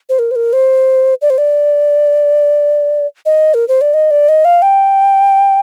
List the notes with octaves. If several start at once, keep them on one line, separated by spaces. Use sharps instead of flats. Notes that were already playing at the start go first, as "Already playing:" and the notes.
C5
A#4
C5
A#4
C5
D5
C5
D5
D#5
A#4
C5
D5
D#5
D5
D#5
F5
G5